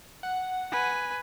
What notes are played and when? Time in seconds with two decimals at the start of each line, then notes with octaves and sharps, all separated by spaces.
0.23 F#5
0.72 B4 G#5